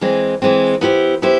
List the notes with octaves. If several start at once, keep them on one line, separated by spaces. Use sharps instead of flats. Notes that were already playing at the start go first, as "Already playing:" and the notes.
E3 G#3 C4
E3 G#3 C4
B3 E4 G4 C5
B3 E4 G4 C5